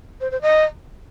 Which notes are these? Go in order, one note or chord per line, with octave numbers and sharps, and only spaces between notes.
C5
C5
D#5